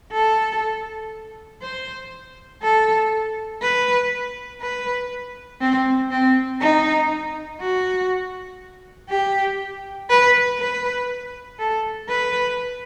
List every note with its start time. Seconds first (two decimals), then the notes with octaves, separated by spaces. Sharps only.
0.12 A4
1.62 C5
2.62 A4
3.62 B4
4.61 B4
5.61 C4
6.11 C4
6.61 D#4
7.61 F#4
9.09 G4
10.10 B4
10.59 B4
11.59 A4
12.09 B4